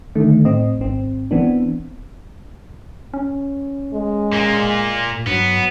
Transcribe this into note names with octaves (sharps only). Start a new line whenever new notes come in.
D3 D#3 A3
A2 C4 D#5
G#1 C4
E3 B3 C4 D4
C#4
G#3
A#2 A#3
G2 F#3 B3